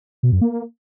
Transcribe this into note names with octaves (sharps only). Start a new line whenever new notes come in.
B2
F#2
A#3